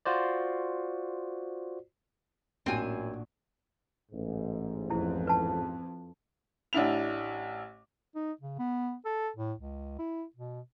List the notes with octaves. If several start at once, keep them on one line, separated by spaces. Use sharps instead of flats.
F4 F#4 C5 D5
A1 F#2 A#2 C4 D4 F#4 G#5
A1 G#2
F2 E4
B4 A5
A1 D4 E4 F7
D#4
C#3
B3
A4
A2
C#2
E4
B2